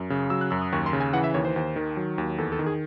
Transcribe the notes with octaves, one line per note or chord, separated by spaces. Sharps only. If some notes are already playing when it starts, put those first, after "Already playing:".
Already playing: F#2
C#3
F#3 E6
F#6
F#2 E6
D#6
D#2 C#6
C6
C#3
G#5
E3 F#5
E5
D#2 C#5
C5
D#2
D#3
F#3
D#2
E2 A4
A4
D#3
G#4